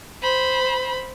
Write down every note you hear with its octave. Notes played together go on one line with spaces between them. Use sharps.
C5 B5